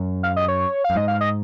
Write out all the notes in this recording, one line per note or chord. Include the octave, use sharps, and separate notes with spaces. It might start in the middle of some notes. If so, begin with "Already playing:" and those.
Already playing: F#2
F5
D#5
C#5
F5
F#2
G#2 D#5
F5
D#5